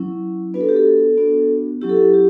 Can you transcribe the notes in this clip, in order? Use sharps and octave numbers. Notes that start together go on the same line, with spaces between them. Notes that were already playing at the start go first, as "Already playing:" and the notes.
Already playing: F#3 C#4 E4
B3 D4 F#4 B4
A4
G4
A4
B3 D4 F#4
F#3 C#4 E4 G4
A4
G4
G4